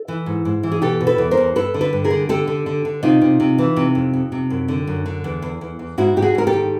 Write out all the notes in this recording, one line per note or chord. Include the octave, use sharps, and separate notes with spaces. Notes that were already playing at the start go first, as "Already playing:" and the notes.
Already playing: A4
E3
G#2
G#2
E3
G#4
B2 G4 A4
B2
A4 B4
E2
A#4 C5
E2
G2 A4 B4
D3
A4 B4
G2
G#4 A#4
D3
D3 G4 A4
D3
D3
D3
C3 D#4 F4
C3
C3
E3
C3
F2
F2
C3
F#2
D3
F#2
D3
E2
E2
E2
E2
G#2 E4 F#4
G#2 G4
F#4 G#4
G#2 A#4
G4 A4
D#3